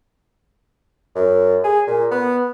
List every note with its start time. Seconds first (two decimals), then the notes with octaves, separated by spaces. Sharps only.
1.15 F#2
1.64 G#4
1.87 A#2
2.11 B3